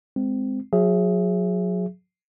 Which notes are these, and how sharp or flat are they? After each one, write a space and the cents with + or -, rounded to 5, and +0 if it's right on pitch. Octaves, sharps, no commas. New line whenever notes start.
G#3 +0 C4 -15
F#3 -30 G#4 +0 E5 +15